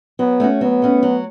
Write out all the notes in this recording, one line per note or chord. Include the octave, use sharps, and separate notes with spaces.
F#3 B3
A3 C#4 F#4
F#3 B3
A3 C#4 F#4
F#3